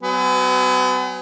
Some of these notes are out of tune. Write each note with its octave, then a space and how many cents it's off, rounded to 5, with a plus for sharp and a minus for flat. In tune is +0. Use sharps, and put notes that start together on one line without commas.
F#3 +35 B3 +40 G#5 +0